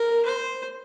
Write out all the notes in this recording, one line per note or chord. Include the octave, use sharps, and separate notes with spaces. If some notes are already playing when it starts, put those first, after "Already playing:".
Already playing: A#4
C5